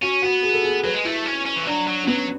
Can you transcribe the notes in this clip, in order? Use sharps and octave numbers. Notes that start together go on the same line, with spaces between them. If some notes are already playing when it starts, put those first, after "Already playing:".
C#4 F#4
B3 F#4
G#4
A4
G#4
F#3 B4
G#3
A3 E4
C#4
C#4
E3
F#3 D4
F#3
C#4
F#3 B3